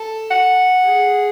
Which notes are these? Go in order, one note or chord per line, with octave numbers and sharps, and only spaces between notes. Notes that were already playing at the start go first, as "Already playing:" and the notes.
Already playing: A4
F#5
G#4